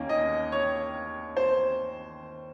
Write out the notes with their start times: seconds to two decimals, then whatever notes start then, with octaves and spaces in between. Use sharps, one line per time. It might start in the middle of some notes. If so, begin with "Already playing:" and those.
Already playing: D#2 D#3 A#3 C#4
0.09 D#5
0.52 C#5
1.37 C5